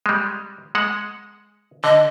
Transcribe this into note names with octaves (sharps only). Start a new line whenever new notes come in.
G3 G#3
G#3 F#5
D3 D#5